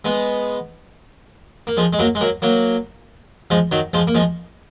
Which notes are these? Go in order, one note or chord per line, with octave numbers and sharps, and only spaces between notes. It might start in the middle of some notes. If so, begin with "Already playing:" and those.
G#3 B3
A#3
F3 G#3
G#3
F#3 A#3
G#3
F#3 A#3
F#3 A#3
F3 G#3
D#3 F#3
F3 G#3
A#3
F3 G#3